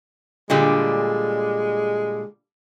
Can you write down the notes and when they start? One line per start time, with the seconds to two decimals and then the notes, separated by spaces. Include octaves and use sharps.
0.50 A#2 D3 G3 G#3